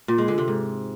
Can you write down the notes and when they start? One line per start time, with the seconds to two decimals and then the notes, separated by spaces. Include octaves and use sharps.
0.08 A#2
0.18 G#3
0.28 D3
0.38 C3
0.48 G#2